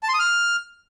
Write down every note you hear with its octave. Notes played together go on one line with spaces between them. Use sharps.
A5
C6
D#6
F6